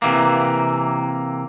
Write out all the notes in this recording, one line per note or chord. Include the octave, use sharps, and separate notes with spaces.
C3 E3 A#3